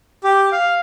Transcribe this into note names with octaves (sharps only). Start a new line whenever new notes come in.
G4
F5